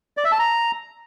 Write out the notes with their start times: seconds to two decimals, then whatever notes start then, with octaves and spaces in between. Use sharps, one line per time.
0.17 D5
0.24 E5
0.32 A5
0.39 A#5